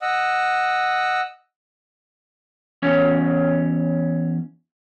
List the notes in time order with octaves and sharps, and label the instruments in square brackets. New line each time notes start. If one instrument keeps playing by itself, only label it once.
[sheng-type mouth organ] D#5 F#5 E6
[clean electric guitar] E2 C#4 C#5